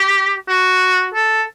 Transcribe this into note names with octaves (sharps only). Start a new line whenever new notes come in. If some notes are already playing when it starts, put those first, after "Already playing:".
Already playing: G4
F#4
A4